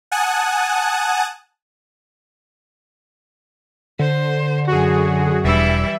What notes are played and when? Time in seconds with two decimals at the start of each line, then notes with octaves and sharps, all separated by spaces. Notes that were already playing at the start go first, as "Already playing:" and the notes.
0.12 F#5 G#5 A5 D#6 F#6
3.99 D3 C5
4.67 F#2 F#4 G#4
5.44 E1 E3 G3 D4 E4 E5